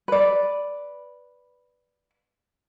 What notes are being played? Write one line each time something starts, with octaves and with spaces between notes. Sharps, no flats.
B4 D5